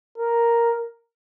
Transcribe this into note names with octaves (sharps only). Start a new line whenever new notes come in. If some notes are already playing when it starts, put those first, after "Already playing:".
A#4